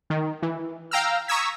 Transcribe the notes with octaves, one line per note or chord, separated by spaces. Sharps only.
D#3
E3
F5 G5 A#5 E6 F6
A#5 C#6 D#6 E6 G#6 B6